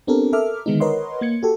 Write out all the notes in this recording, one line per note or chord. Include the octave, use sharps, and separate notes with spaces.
B3 C4 D4 G4 A4 A#4
A4 A#4 E5 D6 F6
D3 D#3 G#3 B3 D#4
A#4 B4 C#5 D#5 F#5 C6
A#3 G#6 C#7
F#4 G4 A4